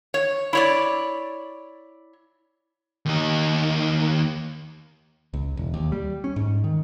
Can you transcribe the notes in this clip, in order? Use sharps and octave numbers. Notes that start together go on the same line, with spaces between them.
C#5
E4 C#5 D5
D#2 D#4
C#2
E1
D#2
G3
C#4
G#2
D#3